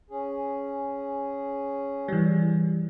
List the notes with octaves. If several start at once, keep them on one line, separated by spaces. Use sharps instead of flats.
C#4 G#4
E3 G3